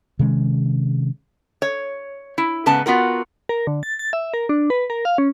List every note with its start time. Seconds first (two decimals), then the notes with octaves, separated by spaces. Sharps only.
0.19 C3 D#3 G#3 C#4
1.62 C#5
2.38 E4
2.66 G#2 C#3 B3 A5
2.86 B3 F4 F#4 A#4
3.49 A#4
3.67 D3
3.83 A6
3.99 A6
4.13 E5
4.34 A#4
4.49 D4
4.70 B4
4.90 A#4
5.05 F5
5.18 C#4